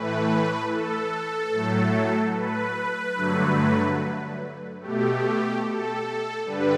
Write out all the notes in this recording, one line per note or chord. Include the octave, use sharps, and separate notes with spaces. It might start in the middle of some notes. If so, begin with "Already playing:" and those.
Already playing: A2 E3 A3 B4
A4
A2 F#3 A3
B4
G2 D3 F#3 A3
B2 A3 G4
A4
G2 D3 G3 B4